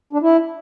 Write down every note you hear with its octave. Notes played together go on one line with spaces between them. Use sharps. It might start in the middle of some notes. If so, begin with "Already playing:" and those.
D4
E4